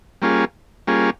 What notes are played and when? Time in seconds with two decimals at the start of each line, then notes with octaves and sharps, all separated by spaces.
0.22 G3 A#3 C#4 F4 G#4
0.87 G3 A#3 C#4 F4 G#4